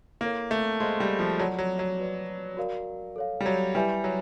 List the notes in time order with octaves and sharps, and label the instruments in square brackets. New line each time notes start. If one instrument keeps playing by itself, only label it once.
[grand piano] A#3 [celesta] E4 A4 C#5
[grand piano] A3
[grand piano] G#3 [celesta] G#4 C5 F5 A5 C6
[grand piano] G3
F3
[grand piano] F#3 [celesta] F4 A4 D5 F#5 B5
[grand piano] F#3
F#3
[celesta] F#4 B4 D5
F#4 A#4 D5 F5
A4 C#5 F5
[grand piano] G3
F#3
[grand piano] G3 [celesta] E4 G4 B4 E5 G#5
[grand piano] F#3